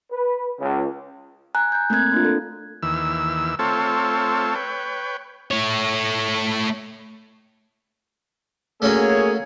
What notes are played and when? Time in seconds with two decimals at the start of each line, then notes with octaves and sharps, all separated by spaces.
0.12 B4
0.61 C#2
1.55 G#5 A#5 F#6
1.72 A#5 G6
1.90 A3 A#3 C4 F#6 G#6
2.12 A#3 D4 F4
2.25 A4
2.83 D#2 E3 E6
3.59 A3 C4 F4 A4 C#5
4.55 B4 C#5 G5
5.51 A3 C#5
8.82 A3 A#3 C#4 F#4 G#4 C#5